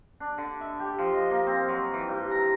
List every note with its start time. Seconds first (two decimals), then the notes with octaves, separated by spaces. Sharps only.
0.20 D4
0.38 D3
0.61 E5
0.80 G4
0.99 F3
1.13 D#5
1.30 A#3
1.47 C4
1.68 F#3
1.93 E3
2.08 G2
2.31 A#5